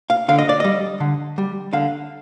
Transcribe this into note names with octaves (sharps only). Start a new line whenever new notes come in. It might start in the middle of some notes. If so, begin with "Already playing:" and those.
F5
D3 F5
D#5
D5
G3 D#5
D3
G3
D3 F5